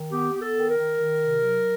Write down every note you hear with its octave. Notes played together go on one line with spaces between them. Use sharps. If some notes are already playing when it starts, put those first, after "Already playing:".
Already playing: D#3
B3 G4
B3
A4
D#3
A#4
D#3
D#3
C3
F#3